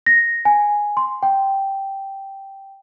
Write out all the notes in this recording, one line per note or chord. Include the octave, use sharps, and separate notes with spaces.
A#6
G#5
C6
G5